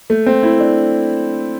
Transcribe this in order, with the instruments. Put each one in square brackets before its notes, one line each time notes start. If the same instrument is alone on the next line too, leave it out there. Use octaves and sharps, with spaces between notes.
[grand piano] A3
C4
E4
D4